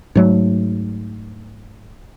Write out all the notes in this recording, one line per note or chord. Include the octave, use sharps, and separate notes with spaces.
G#2 F#3 A3